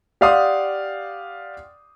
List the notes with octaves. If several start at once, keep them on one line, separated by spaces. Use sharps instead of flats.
G4 D5 F5 F#5 C6 D#6